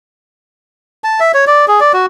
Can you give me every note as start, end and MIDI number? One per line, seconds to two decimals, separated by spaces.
1.04 1.20 81
1.20 1.32 76
1.34 1.45 73
1.47 1.65 74
1.68 1.80 68
1.80 1.92 74
1.93 2.06 66